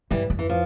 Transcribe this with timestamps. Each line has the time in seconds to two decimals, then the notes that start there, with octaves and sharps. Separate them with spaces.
0.11 G2 E3 G3
0.30 F2
0.39 E3
0.49 F3